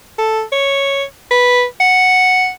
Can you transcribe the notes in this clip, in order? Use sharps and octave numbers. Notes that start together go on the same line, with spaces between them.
A4
C#5
B4
F#5